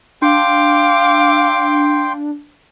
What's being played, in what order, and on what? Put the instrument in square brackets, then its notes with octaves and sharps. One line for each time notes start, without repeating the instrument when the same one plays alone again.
[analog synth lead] D4 [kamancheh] F5 D6 [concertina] G5 C6